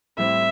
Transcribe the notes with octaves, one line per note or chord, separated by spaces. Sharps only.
A2 G3 C4 E4 E5